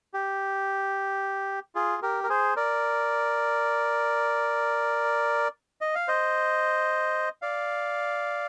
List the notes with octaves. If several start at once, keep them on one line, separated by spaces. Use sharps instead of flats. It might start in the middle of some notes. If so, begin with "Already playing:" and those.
G4
F4 G#4
G4 A#4
A#4
G#4 C5
A#4 D5
D#5
F5
C5 D#5
D5 F5